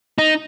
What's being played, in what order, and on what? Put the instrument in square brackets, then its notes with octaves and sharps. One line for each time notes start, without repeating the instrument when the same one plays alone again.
[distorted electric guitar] D#4